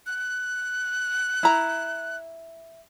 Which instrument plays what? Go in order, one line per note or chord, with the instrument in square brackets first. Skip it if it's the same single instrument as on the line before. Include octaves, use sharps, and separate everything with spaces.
[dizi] F#6
[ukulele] E4 A#5